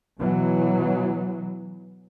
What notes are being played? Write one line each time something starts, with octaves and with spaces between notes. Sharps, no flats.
B2 E3 F#3